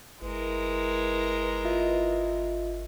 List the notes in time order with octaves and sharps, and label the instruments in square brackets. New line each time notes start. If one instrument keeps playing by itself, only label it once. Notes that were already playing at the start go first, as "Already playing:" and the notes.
[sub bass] G1 [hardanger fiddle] G#3 A#4 [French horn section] E4 B4
[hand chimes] F4 D#5 E5